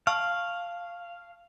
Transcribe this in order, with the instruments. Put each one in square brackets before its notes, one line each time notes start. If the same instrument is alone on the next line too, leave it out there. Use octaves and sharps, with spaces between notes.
[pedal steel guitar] F5 [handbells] A5 C#6